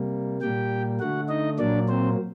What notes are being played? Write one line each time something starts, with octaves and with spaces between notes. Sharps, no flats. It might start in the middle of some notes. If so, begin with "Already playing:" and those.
Already playing: C3 G3 A#3
A#2 G3 A#3 G4 G5
D3 A3 F#4 F#5
D#4 D#5
A#2 F#3 A#3 D4 D5
C4 C5